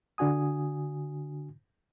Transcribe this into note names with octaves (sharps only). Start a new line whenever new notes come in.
D3 D4 F#4 G#5 D#6